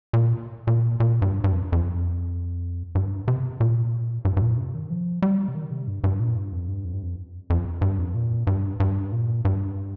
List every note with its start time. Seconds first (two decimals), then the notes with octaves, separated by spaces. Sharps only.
0.13 A#2
0.67 A#2
1.00 A#2
1.22 G2
1.44 G2
1.53 F2
1.72 F2
2.95 G2
3.28 C3
3.60 A#2
4.25 G2
4.37 G2
4.42 A#2
4.57 C3
4.74 D#3
4.90 F3
5.22 G3
5.48 C3
5.55 D#3
5.71 C3
5.87 G2
6.04 G2
6.20 A#2
6.36 G2
6.52 F2
6.68 G2
6.85 F2
6.93 G2
7.03 F2
7.50 F2
7.81 G2
7.98 F2
8.15 A#2
8.47 G2
8.80 G2
9.12 A#2
9.45 G2